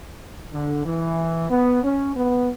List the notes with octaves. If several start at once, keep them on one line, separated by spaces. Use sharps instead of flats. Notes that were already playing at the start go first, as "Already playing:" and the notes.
D3
E3
B3
C#4
B3